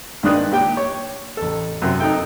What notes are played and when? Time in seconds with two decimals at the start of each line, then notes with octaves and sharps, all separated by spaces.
0.23 G2 D#3 G#3 D4 D#6 F#6
0.52 A#2 G4 G5
0.77 C#5
1.37 A1 A4
1.82 F#2 C3
2.00 D#4 A4 G5